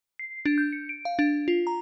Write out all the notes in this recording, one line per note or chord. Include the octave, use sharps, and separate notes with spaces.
C7
D4
G6
C#7
D7
F5
D4
F4
A#5